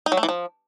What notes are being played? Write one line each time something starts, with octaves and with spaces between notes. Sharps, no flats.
D#4
F#3
A3
E3
F3